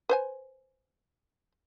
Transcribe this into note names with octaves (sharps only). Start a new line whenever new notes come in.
B4 C5 G#5